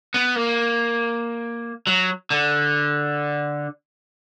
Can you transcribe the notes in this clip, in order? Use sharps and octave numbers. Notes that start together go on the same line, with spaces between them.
B3
A#3
F#3
D3